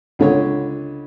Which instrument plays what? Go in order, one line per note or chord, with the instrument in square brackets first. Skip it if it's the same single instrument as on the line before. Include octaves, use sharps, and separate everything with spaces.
[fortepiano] C#2 D3 C#5